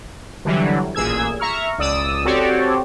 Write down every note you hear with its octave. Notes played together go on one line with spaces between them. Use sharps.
D3 E3 F#3 G3
A1 A#2 G#4 E6 G#6
E5 A#5 C#6 F6
C#2 D5 D#6 E6
C4 F#4 G4 A4 C#5 D5